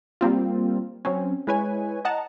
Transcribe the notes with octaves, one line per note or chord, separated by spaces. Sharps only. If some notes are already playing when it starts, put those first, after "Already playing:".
G3 A#3 C4 F4
F#3 C4 C#4
G#3 E4 B4 C#5 G#5
D#5 F#5 A5 A#5